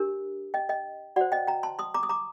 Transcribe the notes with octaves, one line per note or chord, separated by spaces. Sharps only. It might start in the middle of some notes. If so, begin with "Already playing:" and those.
Already playing: D4 G4 A#4
D#5 G5
D#5 G5
F#4 C5 D5 F#5
D#5 G5
G5 A#5
A5 C6
C6 D#6
A#5 D6
D#6
A#5 D6